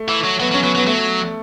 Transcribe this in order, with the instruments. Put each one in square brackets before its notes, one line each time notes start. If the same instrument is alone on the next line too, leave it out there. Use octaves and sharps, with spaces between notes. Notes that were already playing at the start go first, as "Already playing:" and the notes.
Already playing: [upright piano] A3
[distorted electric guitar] E3
F#3
[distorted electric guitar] F#3 [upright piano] B3
[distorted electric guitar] F#3 [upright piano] C#4
[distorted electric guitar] F#3 [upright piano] B3
[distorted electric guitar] F#3 [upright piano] B3
[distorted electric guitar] F#3 [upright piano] A3